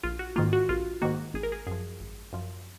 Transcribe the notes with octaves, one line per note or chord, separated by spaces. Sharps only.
A#1 F4
F#4
G#2 D#3 A#3 F4
F#4
A#1 F4
G#2 D#3 A#3 F#4
G#1 G#4
A#4
G#4
F#2 F3 G#4
G#1
F#2 F3